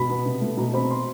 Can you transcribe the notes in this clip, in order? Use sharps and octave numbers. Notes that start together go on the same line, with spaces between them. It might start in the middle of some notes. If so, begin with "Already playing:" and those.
Already playing: B2 B5
B3
C3
A3
B2 A#5
C4 B5
C6